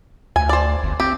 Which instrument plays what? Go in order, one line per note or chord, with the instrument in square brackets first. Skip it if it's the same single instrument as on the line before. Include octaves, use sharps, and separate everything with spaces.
[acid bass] D2 [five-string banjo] G#5
[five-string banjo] C5 D5
[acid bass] G1
[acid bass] C4 [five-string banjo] G4